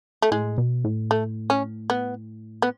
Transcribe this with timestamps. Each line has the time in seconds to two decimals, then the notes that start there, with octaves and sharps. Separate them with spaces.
0.22 A3
0.31 A2 G#3
0.58 B2
0.84 A2
1.11 A3
1.50 C#4
1.90 B3
2.62 B3